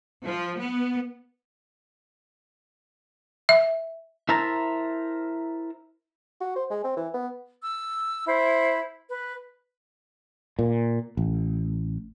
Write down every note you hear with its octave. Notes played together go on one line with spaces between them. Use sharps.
F3
B3
E5
E4 A#4 C5 E5 A5 A#5
F#4
C5
G#3
C4
E3
B3
E6
E4 C5
B4
A#2
A1